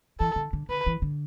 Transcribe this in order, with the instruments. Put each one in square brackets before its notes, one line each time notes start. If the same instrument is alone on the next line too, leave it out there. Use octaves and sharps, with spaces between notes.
[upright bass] E3 [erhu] A4
[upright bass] D3
D3
[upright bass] D3 [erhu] B4
[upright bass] E3
D3